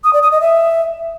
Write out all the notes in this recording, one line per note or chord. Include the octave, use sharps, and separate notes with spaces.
D#6
D5
D#6
D#5
E5